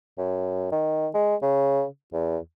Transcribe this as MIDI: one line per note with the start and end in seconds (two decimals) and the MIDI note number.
0.18 0.72 42
0.72 1.07 51
1.14 1.35 56
1.42 1.85 49
2.13 2.37 40